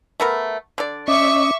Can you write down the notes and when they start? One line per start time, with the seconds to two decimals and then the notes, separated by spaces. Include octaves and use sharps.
0.20 A3 B3 A#4
0.78 D3 D5
1.08 C#4 D#5 E5 C#6 D6